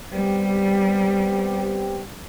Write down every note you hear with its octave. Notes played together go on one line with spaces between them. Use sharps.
G3 B3 C4 G4